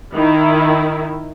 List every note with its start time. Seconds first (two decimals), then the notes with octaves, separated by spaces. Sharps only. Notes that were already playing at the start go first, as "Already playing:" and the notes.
0.14 D#3 E4